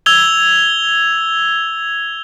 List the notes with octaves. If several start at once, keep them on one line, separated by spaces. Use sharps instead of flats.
E6 G#6 F7 G7